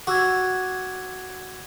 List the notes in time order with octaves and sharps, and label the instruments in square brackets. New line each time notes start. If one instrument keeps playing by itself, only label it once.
[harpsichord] F#4 [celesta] D6 E6 G#6